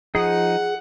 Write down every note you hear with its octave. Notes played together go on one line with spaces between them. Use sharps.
F3 D#4 G#4 F#5